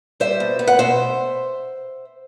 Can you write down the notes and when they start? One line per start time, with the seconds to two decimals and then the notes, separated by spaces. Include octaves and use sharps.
0.20 G3 C5 E5
0.40 B2
0.59 B3
0.67 F#5
0.79 B2 C5 E5